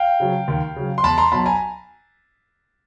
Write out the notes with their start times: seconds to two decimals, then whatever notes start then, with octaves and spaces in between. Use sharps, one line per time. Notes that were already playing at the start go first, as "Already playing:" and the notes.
Already playing: F5 G5
0.20 C#3 F#3
0.48 D#2
0.76 C#3 F#3
0.98 C6
1.04 E2 A5 B5
1.18 A#5 C6
1.32 B2 F#3 A5 B5
1.46 G#5 A#5